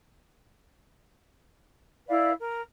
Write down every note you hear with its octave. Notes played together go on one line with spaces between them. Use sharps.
E4 B4 D5 F5
A#4